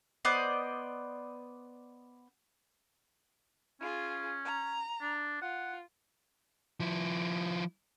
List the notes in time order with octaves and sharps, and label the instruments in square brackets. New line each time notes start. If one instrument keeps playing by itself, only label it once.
[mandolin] B3 C5 D5 D#5
[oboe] C#4 [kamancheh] F4 G#4
[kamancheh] A#5
[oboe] D4
[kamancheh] F4 [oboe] F#5
[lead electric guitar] F3 E4